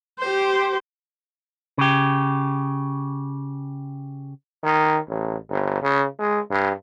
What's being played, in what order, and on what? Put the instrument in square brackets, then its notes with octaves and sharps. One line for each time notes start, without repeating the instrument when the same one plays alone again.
[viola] G4 C5
[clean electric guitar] C#3 G4
[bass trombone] D#3
A1
G1
C#3
G#3
G2